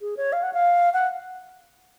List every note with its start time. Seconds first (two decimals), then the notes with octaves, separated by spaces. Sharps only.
0.01 G#4
0.17 C#5
0.33 F5
0.43 F#5
0.53 F5
0.93 F#5